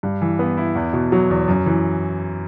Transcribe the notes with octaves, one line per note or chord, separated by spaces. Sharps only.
G2
E3
B3
E4
E2
B2
F#3
E2
F#2
E3